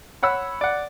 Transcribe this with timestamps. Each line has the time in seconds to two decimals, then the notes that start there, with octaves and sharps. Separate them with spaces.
0.23 C#5 F#5 B5 E6
0.61 D5 F#5